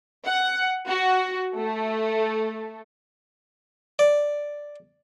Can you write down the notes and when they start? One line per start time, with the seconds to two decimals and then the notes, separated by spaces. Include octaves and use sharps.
0.26 F#5
0.88 F#4
1.56 A3
3.99 D5